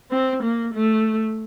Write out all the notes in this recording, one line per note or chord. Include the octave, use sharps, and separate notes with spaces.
C4
A#3
A3